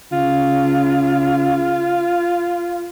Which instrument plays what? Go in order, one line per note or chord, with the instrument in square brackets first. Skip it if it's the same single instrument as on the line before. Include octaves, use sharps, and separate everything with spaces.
[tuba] C#3 [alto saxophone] F4